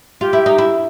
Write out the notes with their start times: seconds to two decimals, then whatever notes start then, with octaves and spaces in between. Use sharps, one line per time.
0.21 F4 G4
0.33 E4
0.46 D#4
0.58 E4